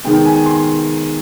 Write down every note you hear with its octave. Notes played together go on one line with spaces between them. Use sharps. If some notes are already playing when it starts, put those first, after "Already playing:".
D#3 G#3 B3 G5
G#5
C6